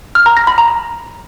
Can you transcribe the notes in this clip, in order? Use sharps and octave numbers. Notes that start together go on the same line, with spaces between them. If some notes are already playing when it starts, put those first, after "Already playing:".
F6
A#5
A#6
B5
A#5